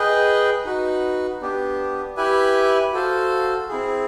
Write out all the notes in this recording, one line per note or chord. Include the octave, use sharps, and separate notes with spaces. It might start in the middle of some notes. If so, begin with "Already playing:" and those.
Already playing: G#4 B4 D#5 G5
D#4 F#4 B4
B3 D4 G4
E4 G4 B4 E5 G#5
F#4 A4 C5 F5
C4 E4 G#4